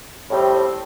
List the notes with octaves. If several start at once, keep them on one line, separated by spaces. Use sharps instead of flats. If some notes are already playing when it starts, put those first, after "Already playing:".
A2 G3 C4